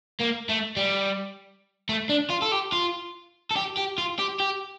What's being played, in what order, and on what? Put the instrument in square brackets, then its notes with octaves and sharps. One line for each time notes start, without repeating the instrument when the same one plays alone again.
[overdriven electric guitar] A#3
A3
G3
A3
D4
F4
A4
G4
F4
A4
G4
G4
F4
G4
G4